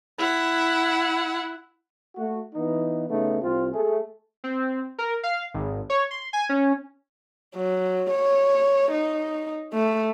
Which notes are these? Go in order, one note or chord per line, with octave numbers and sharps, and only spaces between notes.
E4 F#5
A3 F#4
E3 B3 D#4
C#3 A3 B3 D#4
C2 C4 F4
A3 G#4
C4
A#4
F5
G#1
C#5
C6
G#5
C#4
F#3
C#5
D#4
A3